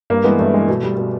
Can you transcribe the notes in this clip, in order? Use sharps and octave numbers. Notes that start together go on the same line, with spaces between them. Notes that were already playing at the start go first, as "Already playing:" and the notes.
G2 A#3
E3 G#3 B3
G2 A3
G#3
E3
B2
G3
B2